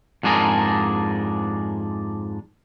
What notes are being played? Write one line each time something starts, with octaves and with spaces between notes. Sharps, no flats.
F2 G#2 D4 G#4 A#4